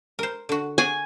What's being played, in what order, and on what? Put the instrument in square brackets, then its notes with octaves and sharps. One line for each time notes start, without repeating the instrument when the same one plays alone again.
[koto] A#4 C5
D3 F#4
[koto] F#4 G#4 D5 [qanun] G#5